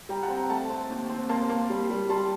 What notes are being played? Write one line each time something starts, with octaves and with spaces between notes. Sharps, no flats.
G3 G5 A#5
F#5 A5
C4
G5 A#5
A3 F#5 A5
C4
D#2
C4
A#3 A5 C6
A#3
G3
G3
G3 A5 C6